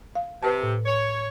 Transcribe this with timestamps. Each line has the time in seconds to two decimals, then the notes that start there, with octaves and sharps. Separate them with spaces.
0.15 F5
0.43 C3 B4 A5
0.63 A2
0.86 C#5